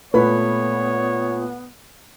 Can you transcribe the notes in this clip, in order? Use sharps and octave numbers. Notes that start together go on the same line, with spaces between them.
A#2 A3 B3 B4 C#5 B5